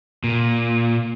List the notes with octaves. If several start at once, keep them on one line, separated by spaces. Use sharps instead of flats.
A#2